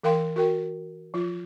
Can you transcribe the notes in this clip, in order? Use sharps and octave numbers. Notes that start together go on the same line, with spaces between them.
E3 A#4 F5 G5 C6
F#4 A#4 G5
F3 F4